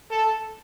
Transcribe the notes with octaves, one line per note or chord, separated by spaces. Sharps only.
A4